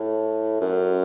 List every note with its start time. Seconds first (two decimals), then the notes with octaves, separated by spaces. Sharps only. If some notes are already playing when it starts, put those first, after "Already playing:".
Already playing: A2
0.61 F#2